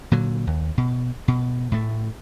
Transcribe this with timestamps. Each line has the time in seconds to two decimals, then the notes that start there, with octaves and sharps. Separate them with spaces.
0.12 A#2 D3 F#3
0.47 D#2
0.78 B2
1.28 B2
1.72 A2 A3